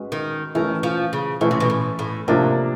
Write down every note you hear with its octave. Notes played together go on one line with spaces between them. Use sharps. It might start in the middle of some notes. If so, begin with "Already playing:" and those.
Already playing: G#3 C#4 F#4 B4
D#3
D#3 E3 A3 C#4
F3
C#3
B2 E3 A3 C#4
C3
B2
A2
A2
A2 C3 F3 A#3 D4